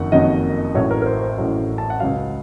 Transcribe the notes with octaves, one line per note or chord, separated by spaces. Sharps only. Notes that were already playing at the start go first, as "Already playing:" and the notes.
Already playing: F#1 F2 D#3 F#3 F#5
F#1 F2 D#3 F#3 D#5
A1 A2 F#3 C#5
A#4
A#4
C5
C5
A1 A2 F#3
A5
F#5
C#2 C#3 F#3 F5